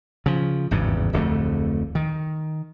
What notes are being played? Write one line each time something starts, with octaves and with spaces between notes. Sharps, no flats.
C#3 F3
G#1 E2 G2 C#3
D1 F2 D3 A3
D#3